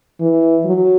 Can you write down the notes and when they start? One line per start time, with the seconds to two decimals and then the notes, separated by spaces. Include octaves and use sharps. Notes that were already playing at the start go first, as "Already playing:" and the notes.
0.21 E3
0.65 F#3